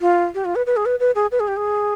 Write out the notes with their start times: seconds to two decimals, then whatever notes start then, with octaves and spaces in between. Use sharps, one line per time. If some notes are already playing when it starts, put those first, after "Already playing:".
0.01 F4
0.35 G4
0.45 F4
0.56 B4
0.66 B4
0.77 G#4
0.86 B4
1.00 B4
1.15 G#4
1.32 B4
1.40 G#4
1.48 G4
1.57 G#4